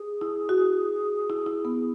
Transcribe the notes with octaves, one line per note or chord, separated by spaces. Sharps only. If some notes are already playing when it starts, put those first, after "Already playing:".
Already playing: G#4
E4
F#4
E4
E4
B3